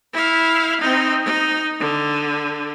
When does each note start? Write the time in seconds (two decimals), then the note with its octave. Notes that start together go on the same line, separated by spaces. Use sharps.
0.13 E4 F5
0.81 C4 D#4
1.25 D#4
1.80 D3